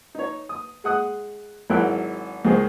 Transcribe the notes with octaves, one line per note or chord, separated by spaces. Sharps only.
D#4 C#5
D#6
G#3 F#5 D#6 F#6
G#1 F#3 E4 A#4 G5 F#6
C#2 D#4 G#4 A#4 C5 C#5